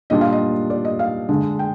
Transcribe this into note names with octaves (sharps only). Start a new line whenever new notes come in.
A#2 G3 D4 F4 D#5
F5
D#5
D5
D#5
F5
D3 G#3 D4
G5